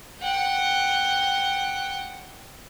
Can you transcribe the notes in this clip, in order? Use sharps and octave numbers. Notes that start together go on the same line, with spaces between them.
F#5 G5